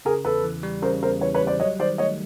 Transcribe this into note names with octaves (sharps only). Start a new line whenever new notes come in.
C#3 G#4 A#4
E2 A4 B4
E3
G3
C#3 A#4 C5
E2 A#4 C5
E3 B4 C#5
B4 C#5
G3
C5 D5
F#3 C#5 D#5
D#3 C5 D5
A3 C#5 D#5